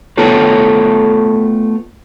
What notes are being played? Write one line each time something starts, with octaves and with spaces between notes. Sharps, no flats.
A3 B3 F4 A4 B4 C#5